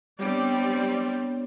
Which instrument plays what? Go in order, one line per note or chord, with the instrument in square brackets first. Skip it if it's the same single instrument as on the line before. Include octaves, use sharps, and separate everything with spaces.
[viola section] G3 C4 D5 [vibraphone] B3 D4 C#5